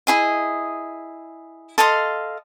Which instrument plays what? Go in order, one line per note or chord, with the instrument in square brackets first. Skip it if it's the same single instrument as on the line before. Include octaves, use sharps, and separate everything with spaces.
[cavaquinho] E4 G#4 D#5
A4 D#5 F5 C6